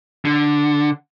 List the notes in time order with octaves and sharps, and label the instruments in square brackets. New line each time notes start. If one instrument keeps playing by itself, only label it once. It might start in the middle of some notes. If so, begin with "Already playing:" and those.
[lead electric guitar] D3